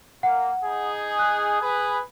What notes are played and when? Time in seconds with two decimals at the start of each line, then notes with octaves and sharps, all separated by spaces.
0.23 A#3 F#5
0.64 D#4 G#4
1.19 F#6
1.61 G#4 B4